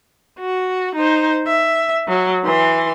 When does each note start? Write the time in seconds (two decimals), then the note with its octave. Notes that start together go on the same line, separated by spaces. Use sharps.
0.40 F#4
0.95 D#4 C5
1.47 E5
2.08 F#3
2.44 E3 C6